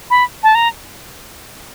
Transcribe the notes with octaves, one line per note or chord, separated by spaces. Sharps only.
B5
A5
A#5